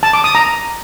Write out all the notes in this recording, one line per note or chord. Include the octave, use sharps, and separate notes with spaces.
A5
D6
D#6
A#5